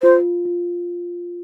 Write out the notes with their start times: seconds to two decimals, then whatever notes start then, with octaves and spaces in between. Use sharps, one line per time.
0.02 F4 C5
0.45 F4